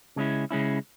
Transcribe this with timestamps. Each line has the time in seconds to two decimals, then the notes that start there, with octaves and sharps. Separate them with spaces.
0.16 C#3 G#3 C#4 E4
0.51 C#3 G#3 C#4 E4